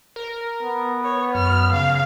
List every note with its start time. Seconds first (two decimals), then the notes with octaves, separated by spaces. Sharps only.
0.16 A#4
0.62 B3
1.04 C#5
1.35 F#2 F6
1.73 C#3 F5